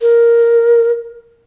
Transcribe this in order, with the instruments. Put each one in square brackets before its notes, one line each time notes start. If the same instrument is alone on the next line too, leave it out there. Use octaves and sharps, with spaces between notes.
[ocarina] A#4